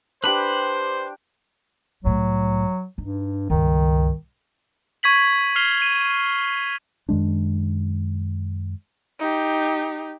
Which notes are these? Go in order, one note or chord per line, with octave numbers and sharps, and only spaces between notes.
D4 G4 B4 C5 B5
C2 A2 F#3
G2 D#4
C#2 G2 D#3
C#6 G#6 B6 F#7
F6 C7 F7 G7
D#7
F#2 D#3 G#3 D4
D#4 G4